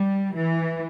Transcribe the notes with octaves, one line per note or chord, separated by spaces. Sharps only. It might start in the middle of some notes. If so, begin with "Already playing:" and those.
Already playing: G3
E3